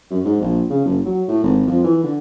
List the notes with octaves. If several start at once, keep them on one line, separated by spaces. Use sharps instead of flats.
F#2
G#2
A#1
C#3
F#1
F#3
A2
G#1
F2
E3
D3